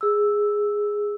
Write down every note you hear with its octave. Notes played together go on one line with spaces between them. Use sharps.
G#4 E6